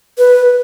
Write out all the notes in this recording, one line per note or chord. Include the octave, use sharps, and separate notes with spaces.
B4